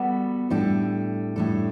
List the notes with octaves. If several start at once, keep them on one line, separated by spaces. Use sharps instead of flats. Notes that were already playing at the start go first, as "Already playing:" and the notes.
Already playing: G3 B3 F#4 A4
A2 G3 D4 A4
A2 G3 D4 A4